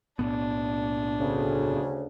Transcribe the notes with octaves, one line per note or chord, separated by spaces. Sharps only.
B1 A2 B3 D4
D2 C#3